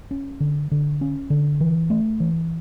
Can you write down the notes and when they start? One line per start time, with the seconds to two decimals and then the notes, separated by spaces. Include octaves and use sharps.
0.11 C#4
0.40 D3
0.71 D3
1.01 C#4
1.30 D3
1.60 E3
1.90 A3
2.20 E3